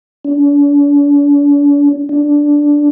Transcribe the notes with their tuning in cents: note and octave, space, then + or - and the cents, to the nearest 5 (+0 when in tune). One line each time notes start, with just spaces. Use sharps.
D4 -40
D4 -5